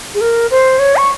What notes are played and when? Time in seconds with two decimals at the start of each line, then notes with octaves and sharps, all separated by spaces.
0.15 G#4
0.21 A#4
0.51 C5
0.79 C#5
0.97 C#6